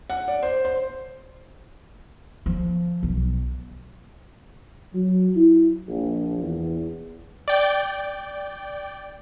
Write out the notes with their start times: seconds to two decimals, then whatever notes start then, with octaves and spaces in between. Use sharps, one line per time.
0.10 F#5
0.28 D5
0.43 C5
0.65 C5
2.46 F3
3.03 B1
4.94 F#3
5.36 E4
5.87 A#1
6.40 E2
7.48 D5 G5